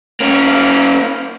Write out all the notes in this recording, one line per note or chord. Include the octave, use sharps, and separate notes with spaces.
A#3 C#4